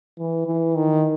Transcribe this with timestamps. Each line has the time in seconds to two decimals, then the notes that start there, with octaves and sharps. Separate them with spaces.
0.19 E3
0.47 E3
0.76 D#3